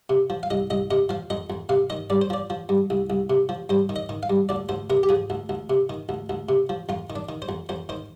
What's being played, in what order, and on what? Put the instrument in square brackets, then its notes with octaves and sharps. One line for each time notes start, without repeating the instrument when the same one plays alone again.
[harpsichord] C3
F3
F5
C2 D#5
C2 D#5
C3 D#5
F3 F5
F2 D#5
F2
C3 F5
D#3 D#5
G2 D5
C5
F3 D5
F3
G2
C2
C2
C3
F3
G2 C5
D#3
D#5
D#3
F5
G2
D2 D5
D2 C5
C3 A#4
G4
F3 G#4
D2
D2
C3
D#3
D2
D2
C3
F3
F2 F4
D#3
D4
D#3
C5
F2
F2 C5
D#3 C5